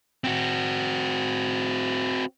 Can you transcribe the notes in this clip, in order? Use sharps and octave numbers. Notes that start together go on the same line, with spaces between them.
C4 F#4